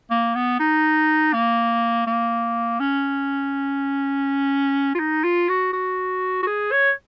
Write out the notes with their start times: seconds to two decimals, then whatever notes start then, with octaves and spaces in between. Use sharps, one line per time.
0.10 A#3
0.35 B3
0.60 D#4
1.33 A#3
2.07 A#3
2.80 C#4
4.95 F4
4.99 D#4
5.24 F4
5.49 F#4
5.73 F#4
6.43 F#4
6.47 G#4
6.72 C#5